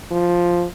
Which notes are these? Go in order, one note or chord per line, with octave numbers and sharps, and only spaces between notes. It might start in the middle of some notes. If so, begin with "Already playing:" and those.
F3